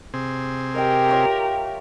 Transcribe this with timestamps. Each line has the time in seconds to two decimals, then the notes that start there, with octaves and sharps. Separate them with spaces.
0.14 C3 C4 G#4
0.75 G4 A#4 D#5 G5
1.09 F4 C#5 E5